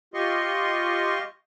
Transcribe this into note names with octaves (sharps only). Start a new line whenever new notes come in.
F4 G4 D#5 C6 C#6